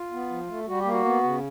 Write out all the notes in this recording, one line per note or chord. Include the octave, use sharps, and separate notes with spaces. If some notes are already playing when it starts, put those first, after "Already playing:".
Already playing: F4
B3
F3
A3
G3 F#4
G4
A#3
F#4
B3
C#3